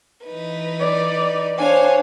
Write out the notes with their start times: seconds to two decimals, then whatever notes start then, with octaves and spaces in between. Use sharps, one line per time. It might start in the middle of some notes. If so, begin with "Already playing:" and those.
0.25 E3 D#4 B4
0.80 D5
1.58 D4 C5 C#5 F5 G#5